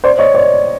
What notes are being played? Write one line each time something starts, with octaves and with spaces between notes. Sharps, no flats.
C5 D5
C#5 D#5
C5 D5